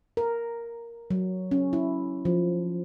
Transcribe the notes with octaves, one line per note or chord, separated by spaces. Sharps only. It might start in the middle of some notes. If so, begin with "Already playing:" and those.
A#4
F#3
C#4
E4
F3